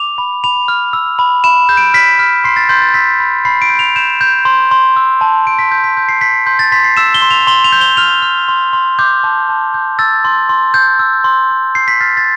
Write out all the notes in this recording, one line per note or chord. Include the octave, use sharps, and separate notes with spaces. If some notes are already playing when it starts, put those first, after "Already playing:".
Already playing: D6 F7
B5
B5 F7
F6
E6
B5
B5 E7
G6
D7
F6 B6
F6
C6 C7
A6
C6 G6
A6
E6 B6
B5
B5 C7
D7
G6
F7
G6 E7
G6
C6
C6
E6
A5
A5 D7
B6
G6
B6
G6
C7
G6 B6
C6 G6
A6
C6 B6
C7
E6 E7
G7
C6
F7
C6 G7
F7
G6
G7
F6 F7
F6
C6
C6
D6 G6
A5
A5
G6
E6 A6
C6
C6
G6
E6
C6
C6
G6 C7
B6
F6 A6
A6